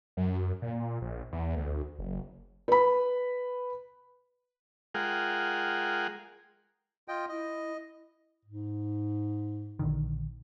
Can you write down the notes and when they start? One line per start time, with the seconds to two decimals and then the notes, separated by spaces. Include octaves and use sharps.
0.17 F#2
0.62 A#2
1.02 A#1
1.32 E2
1.56 D2
1.99 F#1
2.68 B4 B5
4.94 G#3 F4 G#4 A#4 F#5 G5
7.08 F4 D#5 G5
7.29 E4 D#5
8.45 G#2
9.79 A#1 D3 D#3